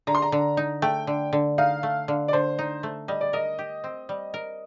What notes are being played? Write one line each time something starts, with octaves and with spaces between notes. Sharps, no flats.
D3 A#5
C6
A#5
D3
D#4
A3 G5
D3
D3
D#4 F5
A3
D3
D5
D3 C5
D#4
A3
G3 D#5
D5
A#4 D#5
G4
C4
G3
A#4